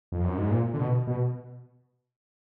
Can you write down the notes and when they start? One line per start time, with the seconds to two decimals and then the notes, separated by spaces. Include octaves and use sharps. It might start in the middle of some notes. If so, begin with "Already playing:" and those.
0.12 F2
0.24 F#2
0.37 G#2
0.51 A#2
0.74 D3
0.79 B2
1.07 B2